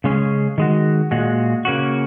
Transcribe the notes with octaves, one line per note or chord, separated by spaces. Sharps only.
C#3 G#3 C#4 G#4
D#3 G#3 F#4
A#2 G#3 F#4
C#3 A#3 C#4 F#4